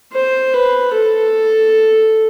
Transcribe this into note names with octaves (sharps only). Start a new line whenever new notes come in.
C5
B4
A4